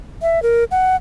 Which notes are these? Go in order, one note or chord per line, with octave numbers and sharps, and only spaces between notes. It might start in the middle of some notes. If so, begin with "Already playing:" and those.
E5
A#4
F#5